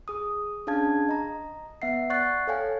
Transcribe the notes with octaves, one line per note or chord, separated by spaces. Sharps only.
G#4 D#6
C#4 D4 G#4 F5 A5 G#6
D#5 A#5
B3 E5 F#5 C7
D5 F#5 C#6 F#6 A6 C7
A4 C#5 F5 G5 G#5